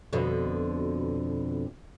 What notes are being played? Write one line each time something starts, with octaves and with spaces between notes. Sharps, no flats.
F2 B2 D3